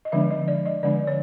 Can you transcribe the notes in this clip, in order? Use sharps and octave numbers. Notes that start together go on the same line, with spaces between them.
D#5
D3 F3 G#3 B3 D4 E5
D#5
D5
D#5
D3 F3 G#3 B3 D4 D5
C#5